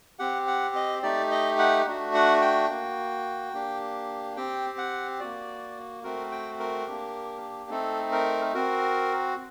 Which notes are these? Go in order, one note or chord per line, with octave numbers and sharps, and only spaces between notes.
C4 G4 F#5
F#5
D#5
A3 D#4 G4 D5
D#5
F#5
A3 D4 F#4
F#5
G5
A#3 F#4
A#3 D4 G4
C4 G4 G5
F#5
A#3 F#4 D5
A3 C4 F#4 A#4
G5
A#4
A#3 D4 G4
A3 C4 D#4 A4
A#4
C4 F#4 A#4